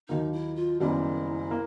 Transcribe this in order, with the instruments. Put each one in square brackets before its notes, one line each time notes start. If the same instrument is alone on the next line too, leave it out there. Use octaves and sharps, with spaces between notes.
[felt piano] D#2 D#3 F#3 A#3 [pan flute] D#4
[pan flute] E4
F4
[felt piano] F#1 F#2 D#3 G3 B3 [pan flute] E4
[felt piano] A#3